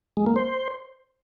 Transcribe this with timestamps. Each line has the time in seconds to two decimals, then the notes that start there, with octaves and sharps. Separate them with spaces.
0.17 G#3
0.26 A#3
0.36 C5